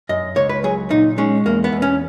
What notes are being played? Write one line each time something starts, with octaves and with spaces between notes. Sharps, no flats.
F#2 D#5
C#2 C#5
B4
F#3 G#4
A#2 D#4
G#3 C#4
E2 A#3
B3
E2
C#4